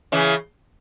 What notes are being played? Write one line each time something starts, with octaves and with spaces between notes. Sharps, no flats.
C#3 E3